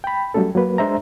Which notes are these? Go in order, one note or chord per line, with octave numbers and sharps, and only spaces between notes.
G5 B5
F#3 G3 A3 C#4 A4
F#3 A#3 B4
G#3 D4 C5 E5 A#5